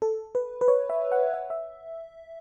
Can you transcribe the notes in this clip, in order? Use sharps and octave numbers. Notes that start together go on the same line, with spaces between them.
A4
B4
B4
C#5
E5
F#5
E5
E5